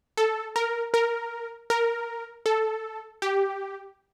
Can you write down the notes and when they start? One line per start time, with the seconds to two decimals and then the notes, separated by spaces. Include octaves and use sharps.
0.17 A4
0.56 A#4
0.94 A#4
1.70 A#4
2.46 A4
3.22 G4